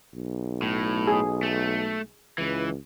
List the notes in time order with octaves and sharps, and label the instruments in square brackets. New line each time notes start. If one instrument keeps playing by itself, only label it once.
[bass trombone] B1
[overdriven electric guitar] A2
[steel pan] G#4
[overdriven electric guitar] A3
[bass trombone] C#2 [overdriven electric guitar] E3